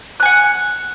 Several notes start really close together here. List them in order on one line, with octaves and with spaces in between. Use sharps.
F#6 G#5 F#5